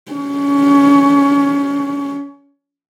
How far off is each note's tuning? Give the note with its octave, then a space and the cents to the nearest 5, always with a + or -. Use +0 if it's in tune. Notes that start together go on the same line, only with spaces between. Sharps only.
C#4 +25